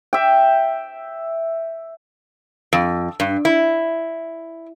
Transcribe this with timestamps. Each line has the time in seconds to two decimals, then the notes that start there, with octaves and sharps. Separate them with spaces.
0.13 E5 G5
2.73 F2
3.20 G2
3.45 E4